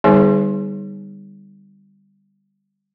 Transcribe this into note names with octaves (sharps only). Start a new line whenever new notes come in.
D3 G3 B3 D#4 G#4 C#5